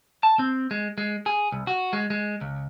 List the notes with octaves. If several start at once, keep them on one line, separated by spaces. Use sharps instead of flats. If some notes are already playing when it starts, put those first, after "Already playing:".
A5
C4
G#3
G#3
G#4
C2
F#4
G#3
G#3
C#2